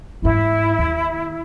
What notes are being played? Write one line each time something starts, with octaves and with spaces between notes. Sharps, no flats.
E2 G#2 E4
D#2